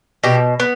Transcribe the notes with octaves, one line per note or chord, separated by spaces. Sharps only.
B2 G4
B3